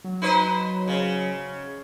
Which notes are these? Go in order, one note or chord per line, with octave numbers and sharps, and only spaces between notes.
F#3
D#4 B4 C5
C#3